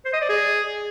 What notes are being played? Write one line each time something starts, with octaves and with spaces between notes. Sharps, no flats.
C5
D#5
D5
G#4